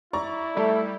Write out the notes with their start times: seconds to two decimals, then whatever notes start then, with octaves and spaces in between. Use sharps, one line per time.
0.13 E4 D5 A#5 C#6
0.57 G3 A3